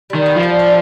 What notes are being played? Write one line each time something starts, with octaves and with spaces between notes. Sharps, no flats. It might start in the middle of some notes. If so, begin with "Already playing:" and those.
D#3 G3
B3
F3
G3
D4